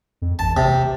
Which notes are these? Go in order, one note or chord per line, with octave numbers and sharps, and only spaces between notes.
F2
A1 A5
D2 C3